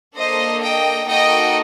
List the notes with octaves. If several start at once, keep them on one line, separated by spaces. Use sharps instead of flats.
A#3 D4 A4 C5 D#5
D#5 G5
A#3 D#4 F#4 A4 D#5 G5